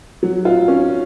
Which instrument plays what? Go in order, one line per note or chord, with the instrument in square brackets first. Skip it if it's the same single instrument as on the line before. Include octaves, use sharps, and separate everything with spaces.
[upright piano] F#3
F4
C#4